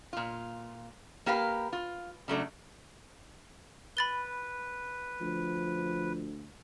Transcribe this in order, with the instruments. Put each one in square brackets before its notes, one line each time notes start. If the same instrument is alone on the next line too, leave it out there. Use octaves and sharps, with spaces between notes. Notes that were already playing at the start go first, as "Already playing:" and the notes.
[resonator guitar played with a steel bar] A#2 F4
A#3 G4 A#4 B4 F5
F4
C#3 F#3 A3 D4
[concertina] B4 [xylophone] B5 A6 G7
[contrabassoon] D2 [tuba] F3